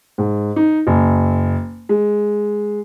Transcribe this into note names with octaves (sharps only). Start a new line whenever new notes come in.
G#2
D#4
F#1
G#3